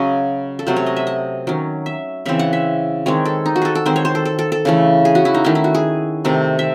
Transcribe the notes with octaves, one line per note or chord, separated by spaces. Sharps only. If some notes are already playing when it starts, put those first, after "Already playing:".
Already playing: C#3 F#3 C#4 D#5
A4
C3 F#3 A3 C#4 C5
C#5
D#5
E5
D#5
D#3 F#3 C#4
E5
C#3 E3 C4 E5
F#5
E5
D#3 G#3 C4 C#5
A4
D#4
F#4
G#4 A4
A4
D#3 G#3 C4 C5
C#5
C5
A4
A4
A4
A4
C#3 E3 A3
G#4
F#4
E4
D#4
D#3 A3 C#4 E4
E4
F#4
G#4
C3 D#3 A3
E5